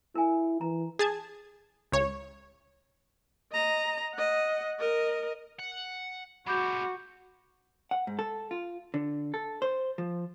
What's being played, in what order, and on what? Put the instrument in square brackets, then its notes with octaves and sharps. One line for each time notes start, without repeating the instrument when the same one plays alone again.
[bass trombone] E4 [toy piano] A#4 G#5
[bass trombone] E3 [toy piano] A#5
[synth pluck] G#4 A5 G#6
C#2 C#5
[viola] D#5 A#5
D#5 F#5
A#4 D#5
[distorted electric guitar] F#5
[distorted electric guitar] F#3 G#3 [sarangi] F#4 [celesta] B5 D6 G6
[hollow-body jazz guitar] F#5
G#2
A4
F4
D3
A4
C5
F3